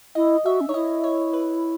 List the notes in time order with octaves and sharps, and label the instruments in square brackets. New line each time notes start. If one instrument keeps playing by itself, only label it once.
[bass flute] E4 [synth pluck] D#5
[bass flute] F#4 [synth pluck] E5
[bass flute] C#4
[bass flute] D#4 [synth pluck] C#5
[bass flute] E4 [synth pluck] D#5
[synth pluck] C#5
B4